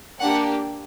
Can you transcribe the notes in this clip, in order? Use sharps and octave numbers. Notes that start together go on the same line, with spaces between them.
A#3 D4 G4 F#5